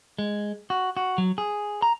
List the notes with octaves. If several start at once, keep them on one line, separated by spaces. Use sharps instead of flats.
G#3
F#4
F#4
F#3
G#4
A#5